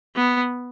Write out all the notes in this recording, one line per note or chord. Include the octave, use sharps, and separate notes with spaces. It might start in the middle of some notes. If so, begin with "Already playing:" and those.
B3